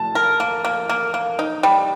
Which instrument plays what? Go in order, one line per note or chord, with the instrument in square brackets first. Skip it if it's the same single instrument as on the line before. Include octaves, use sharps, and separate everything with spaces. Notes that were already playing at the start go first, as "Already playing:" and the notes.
Already playing: [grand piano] A5
[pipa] A#4
A#3
A#3
A#3
A#3
D#4
G3